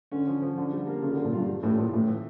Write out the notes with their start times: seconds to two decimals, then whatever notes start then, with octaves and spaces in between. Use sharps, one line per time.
0.12 D3 C#4
0.27 F3
0.42 F3
0.57 D3
0.72 G3
0.87 A#3
1.02 C#3 F4
1.13 D3
1.17 G3
1.24 A#2
1.33 G2 F4
1.47 G3
1.63 A2 E3
1.78 A#2 E3
1.93 A2 E3
2.08 E3